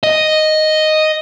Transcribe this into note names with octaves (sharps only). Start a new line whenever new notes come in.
D#5